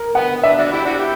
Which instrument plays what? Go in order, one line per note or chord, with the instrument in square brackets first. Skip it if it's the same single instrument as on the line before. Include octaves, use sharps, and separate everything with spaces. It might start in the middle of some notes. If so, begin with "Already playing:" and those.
Already playing: [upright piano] A#4
[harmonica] B3 [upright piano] F#5
[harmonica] B3 D4 [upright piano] E5
[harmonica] D4 F#4
E4 G4
D4 F#4
E4 G4